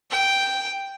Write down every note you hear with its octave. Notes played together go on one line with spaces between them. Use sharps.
G5